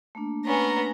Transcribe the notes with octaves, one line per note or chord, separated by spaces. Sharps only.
A3 A#3 D4
B3 C#4 A#5